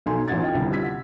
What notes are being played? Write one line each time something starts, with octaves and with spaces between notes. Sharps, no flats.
B1 D#4 A4 G#5 C6
A1 B3 D#4 F#5 G#6 A6
F4 D#5 G5
C2 G2 D3
G3 F4 E6 G#6 B6
F#5